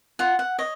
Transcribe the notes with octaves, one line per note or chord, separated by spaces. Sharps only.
F4 F#5
F#5
C#5 D#5